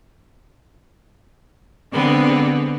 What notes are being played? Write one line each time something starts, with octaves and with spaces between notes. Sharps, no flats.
D3 G#3 B3 C4